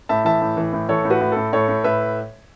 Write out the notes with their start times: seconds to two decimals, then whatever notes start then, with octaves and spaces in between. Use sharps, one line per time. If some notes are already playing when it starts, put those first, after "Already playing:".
0.09 A2 E5 A5
0.25 E3 E5 A5
0.42 A2
0.57 E3
0.73 A2
0.89 E3 A4 C#5
1.05 A2
1.10 F#4 B4
1.21 A2
1.32 A2 A4
1.53 A2 A4 C#5
1.68 A2
1.84 A2 B4 E5